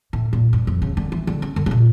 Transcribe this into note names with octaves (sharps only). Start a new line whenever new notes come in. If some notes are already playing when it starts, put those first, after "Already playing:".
A2
A#2
G2
F2
C#3
D3
E3
D3
C#4
D3
C#3
A#2